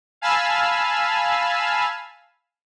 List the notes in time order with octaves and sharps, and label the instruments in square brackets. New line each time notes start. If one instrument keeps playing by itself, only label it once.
[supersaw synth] F5 G#5 A5 B5 E6 F6